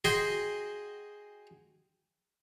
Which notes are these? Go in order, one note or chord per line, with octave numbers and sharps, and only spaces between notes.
F#4 G#4 D#5 G5 G#5 C6